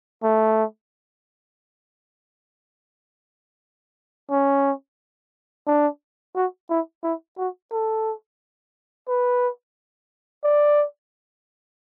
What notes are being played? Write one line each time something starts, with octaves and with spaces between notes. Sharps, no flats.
A3
C#4
D4
F#4
E4
E4
F#4
A4
B4
D5